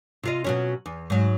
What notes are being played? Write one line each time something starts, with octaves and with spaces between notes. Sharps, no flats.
C3 F4 D#5
B2 F#3 C#4
E2
G#2 F#3